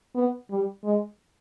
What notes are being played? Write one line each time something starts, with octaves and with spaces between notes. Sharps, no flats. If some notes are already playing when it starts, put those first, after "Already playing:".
B3
G3
G#3